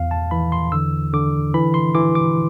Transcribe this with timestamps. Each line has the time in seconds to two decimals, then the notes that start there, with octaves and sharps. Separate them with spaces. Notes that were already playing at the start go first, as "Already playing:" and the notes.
Already playing: E2 F5
0.11 A5
0.31 E3 B5
0.52 C6
0.72 D3 E6
1.13 D3 D6
1.54 E3 B5
1.74 C6
1.95 E3 D6
2.15 D6